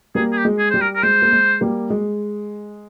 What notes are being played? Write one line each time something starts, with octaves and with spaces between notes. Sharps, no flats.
G3 A#3 G#4
G#4
G4
G#3
G#4
G3 C5
A#4
A#4
G#3 C5
A#3
G#3
G3 A#3
G#3